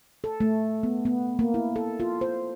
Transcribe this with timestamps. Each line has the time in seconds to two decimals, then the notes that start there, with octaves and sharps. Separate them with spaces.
0.24 A4
0.40 A3
0.83 B3
1.05 B3
1.39 A#3
1.54 E4
1.76 A4
2.00 F4
2.21 C5